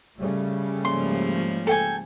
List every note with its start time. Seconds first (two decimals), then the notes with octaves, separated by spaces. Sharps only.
0.18 C#3 G3 A3
0.85 G#2 F3 A#3 C6
1.67 A4 G5 G#5